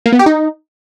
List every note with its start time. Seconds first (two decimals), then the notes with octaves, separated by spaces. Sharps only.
0.06 A#3
0.12 B3
0.19 G4
0.26 D#4